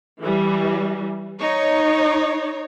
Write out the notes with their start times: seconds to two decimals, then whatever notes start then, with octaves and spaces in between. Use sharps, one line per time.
0.22 E3 G3
1.38 D#4 C#5